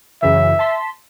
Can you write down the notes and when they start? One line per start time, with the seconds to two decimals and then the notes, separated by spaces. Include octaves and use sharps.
0.22 F#2 C#3 E3 E5
0.59 A5 C6 B6